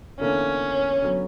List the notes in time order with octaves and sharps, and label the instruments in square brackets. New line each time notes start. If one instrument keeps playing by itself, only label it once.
[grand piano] E2 D3 A#3 [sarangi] C#4
[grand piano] D3 F#3 B3